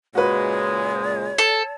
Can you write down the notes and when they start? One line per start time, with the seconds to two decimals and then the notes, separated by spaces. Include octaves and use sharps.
0.15 C#2 A#2 G#3 F#4 B4 C#5
1.38 A4